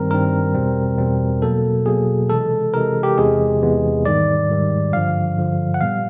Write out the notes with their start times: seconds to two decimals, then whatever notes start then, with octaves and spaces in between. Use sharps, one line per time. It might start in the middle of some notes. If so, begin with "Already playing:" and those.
Already playing: G2 D#3 G3 C4 A#4
0.11 G2 D#3 G3 C4 A#4
0.54 E2 B2 G3 C4
0.98 E2 B2 G3 C4
1.42 B2 F#3 A#3 A4
1.86 B2 F#3 A#3 G#4
2.30 C3 E3 G#3 A4
2.74 C3 E3 G#3 A#4
3.03 G4
3.18 E2 C3 E3 G#3 B3 G#4
3.62 E2 C3 E3 G#3 B3
4.05 G#2 D#3 G3 D5
4.49 G#2 D#3 G3
4.93 G2 D3 F3 F5
5.37 G2 D3 F3
5.74 F#5
5.81 A#2 G3 B3 F5